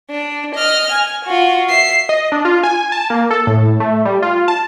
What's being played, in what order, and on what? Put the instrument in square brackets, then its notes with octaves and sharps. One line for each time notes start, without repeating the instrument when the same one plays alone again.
[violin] D4
D#5 F6
G#5
F4 F#4
E5 C7
[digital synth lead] D#5
D4
F4
G#5
A5
A#3
A4
A2
A3
G3
F4
A5